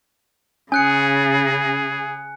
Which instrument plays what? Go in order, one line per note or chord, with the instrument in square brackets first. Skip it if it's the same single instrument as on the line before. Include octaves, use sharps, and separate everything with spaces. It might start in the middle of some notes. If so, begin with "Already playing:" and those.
[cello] C#3 [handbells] C#4 [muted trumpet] G#4 [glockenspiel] G#5 F#6 C#7